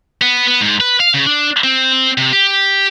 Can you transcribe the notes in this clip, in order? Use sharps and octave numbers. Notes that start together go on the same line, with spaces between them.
B3
B3
G#2
B4
F5
C#3
D4
C4
C3
G4